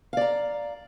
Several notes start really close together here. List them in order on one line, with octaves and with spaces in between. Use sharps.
F5 D5 A#5